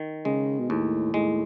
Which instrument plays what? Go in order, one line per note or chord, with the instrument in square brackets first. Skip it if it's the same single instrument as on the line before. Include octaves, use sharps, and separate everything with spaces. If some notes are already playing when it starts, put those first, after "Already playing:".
Already playing: [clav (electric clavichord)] D#3
[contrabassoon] C#3 [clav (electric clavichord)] G#3
[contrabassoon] B2
[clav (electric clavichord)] D#2 [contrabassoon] A2
[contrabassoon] A2 [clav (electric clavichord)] G#3